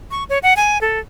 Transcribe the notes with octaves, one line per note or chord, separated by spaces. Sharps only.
C#6
C#5
F#5
G#5
A4